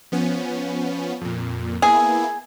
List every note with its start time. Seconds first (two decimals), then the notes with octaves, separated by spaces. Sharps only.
0.12 F3 B3 C#4
1.21 F2 A#2
1.82 A#3 B3 E4 G#4